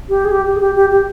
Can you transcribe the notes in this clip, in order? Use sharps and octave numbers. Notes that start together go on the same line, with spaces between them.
G4
G#4
G4
G4
G#4
G4
G4
G4